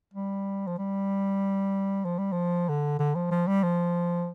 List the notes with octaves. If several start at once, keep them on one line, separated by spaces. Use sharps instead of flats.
G3
F3
G3
F3
G3
F3
D3
D3
F3
F3
G3
F3